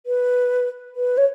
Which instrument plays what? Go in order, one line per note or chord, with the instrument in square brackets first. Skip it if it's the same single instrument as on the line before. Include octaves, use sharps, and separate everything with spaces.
[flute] B4
B4
C#5